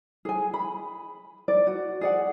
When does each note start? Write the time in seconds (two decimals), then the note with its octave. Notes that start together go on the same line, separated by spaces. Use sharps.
0.25 G#4 G#5
0.54 B5
1.48 D5
1.67 F#4
2.01 G#4 D5 F#5